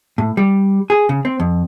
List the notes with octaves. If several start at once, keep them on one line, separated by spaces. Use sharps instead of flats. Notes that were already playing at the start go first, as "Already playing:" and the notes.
A2
G3
G#4
C#3
C4
F2